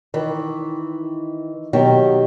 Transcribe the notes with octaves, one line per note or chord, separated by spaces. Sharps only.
D#3 E3
B2 D#3 F#3 G4